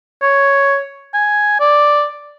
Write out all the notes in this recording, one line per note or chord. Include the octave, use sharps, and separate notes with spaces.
C#5
G#5
D5